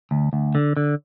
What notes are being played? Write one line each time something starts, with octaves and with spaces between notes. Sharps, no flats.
D2
D2
D3
D3